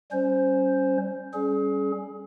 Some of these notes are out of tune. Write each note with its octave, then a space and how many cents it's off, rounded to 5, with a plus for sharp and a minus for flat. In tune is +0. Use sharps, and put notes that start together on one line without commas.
G3 -20 C#4 -5 C5 +0
G3 -5 C#4 +0 G#4 +35